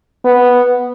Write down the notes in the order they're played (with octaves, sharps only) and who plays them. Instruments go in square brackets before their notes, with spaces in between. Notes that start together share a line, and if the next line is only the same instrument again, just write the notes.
[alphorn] B3